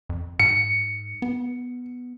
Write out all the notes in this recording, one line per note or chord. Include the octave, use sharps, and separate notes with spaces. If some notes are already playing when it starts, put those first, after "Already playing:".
F2
G#2 C#7
B3